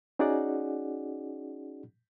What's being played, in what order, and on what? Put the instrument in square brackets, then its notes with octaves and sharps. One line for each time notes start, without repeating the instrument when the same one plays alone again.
[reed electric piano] C#4 D#4 F#4 G#4 D5 F#5